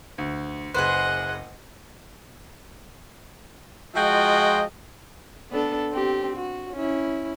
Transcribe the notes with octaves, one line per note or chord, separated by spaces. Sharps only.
D2
F#1 G#4 B4 C5 D#5 F#5 F#6
F3 G#3 F4 F#4 D#5 G5
B3 D4 A4
C4 G4
F#4
C#4 E4